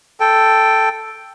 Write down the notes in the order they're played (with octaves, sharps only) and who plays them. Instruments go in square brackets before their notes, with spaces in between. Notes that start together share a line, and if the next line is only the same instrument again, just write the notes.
[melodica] A4 G5